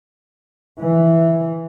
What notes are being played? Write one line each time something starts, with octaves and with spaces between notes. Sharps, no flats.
E3